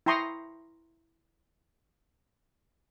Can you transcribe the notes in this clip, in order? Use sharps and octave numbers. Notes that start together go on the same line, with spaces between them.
E4 G5 A#5 C6 C#6 D#6